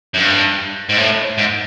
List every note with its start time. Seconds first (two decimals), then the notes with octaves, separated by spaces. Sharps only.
0.14 F#2
0.19 G2
0.89 G#2
0.97 A2
1.38 G#2